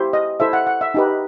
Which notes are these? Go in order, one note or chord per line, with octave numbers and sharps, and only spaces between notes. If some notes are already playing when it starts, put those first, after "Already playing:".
Already playing: E4 G4 C5
D#5
E4 A4 C5 E5
F#5
F#5
E5
D#4 G4 B4